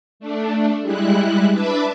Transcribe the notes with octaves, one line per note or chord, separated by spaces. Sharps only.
A3 D4
G3 G#3 E4 F#6
D4 B4 E5 A5 B5 D6